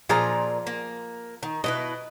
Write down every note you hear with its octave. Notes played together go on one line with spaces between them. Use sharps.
A#2 F3 F4 G#4 D5 A#5
A#3
D#3
B2 E4 B4 D#5